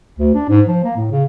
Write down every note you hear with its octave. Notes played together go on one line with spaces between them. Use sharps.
D2
D4
G#2
F3
A#3
A2
C#3